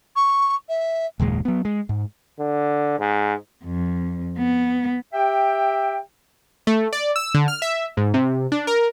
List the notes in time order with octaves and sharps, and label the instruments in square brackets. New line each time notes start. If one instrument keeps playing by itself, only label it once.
[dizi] C#6
E5
[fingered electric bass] F#1 D#2 A#2 G#3
F#3 B3
G#3
G#2
[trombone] D3
G#2
[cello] F2
B3
[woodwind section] G4 E5 G5
[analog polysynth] A3
D5
E6
D3
F6
E5
G#2
C3
D4
A#4